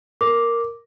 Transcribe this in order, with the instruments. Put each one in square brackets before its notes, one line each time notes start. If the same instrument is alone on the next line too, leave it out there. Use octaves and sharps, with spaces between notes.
[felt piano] A#4 [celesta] D6